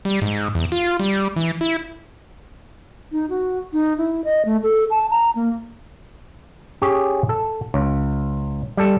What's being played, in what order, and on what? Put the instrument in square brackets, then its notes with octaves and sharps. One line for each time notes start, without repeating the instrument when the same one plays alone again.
[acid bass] G3
G#2
E2
F4
G3
E3
E4
[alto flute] D#4
F#4
D#4
E4
D#5
A3
A4
A5
A#5
A#3
[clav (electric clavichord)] C#4 G4 G#4 C#5
A4
C#2
G3 A4